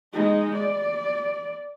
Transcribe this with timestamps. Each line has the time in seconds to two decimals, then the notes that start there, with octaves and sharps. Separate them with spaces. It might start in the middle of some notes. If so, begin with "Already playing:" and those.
0.13 G#3 D#4
0.56 D5